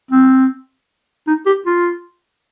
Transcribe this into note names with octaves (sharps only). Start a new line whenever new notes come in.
C4
D#4
G4
F4